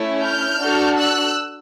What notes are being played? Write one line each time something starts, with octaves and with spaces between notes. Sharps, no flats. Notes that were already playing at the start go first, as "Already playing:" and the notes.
Already playing: A3 C#4 E4
F6 G6
D4 F#4 A4
E6 F#6